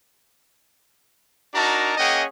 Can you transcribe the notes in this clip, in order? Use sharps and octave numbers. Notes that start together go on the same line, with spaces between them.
D4 D#4 F#4 A#4 A5 A#5
A#3 C#4 G#4 D#5 F#5 G5